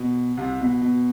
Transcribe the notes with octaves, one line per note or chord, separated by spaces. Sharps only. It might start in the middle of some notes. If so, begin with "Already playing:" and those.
Already playing: B2
C2 C3
B2
B2